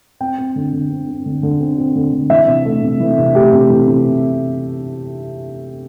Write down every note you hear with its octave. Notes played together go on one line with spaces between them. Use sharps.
C4 G5
C4
D3
D3
C4
C4
D3
D3
C4
C4
D3
D3
E3 E5
C3
A3
C3
E3
C3
A3 G4
C3
E3
C3